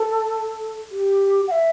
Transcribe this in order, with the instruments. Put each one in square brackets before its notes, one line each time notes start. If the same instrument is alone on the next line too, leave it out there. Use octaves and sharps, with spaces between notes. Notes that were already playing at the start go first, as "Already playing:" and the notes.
Already playing: [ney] A4
G4
F#5
E5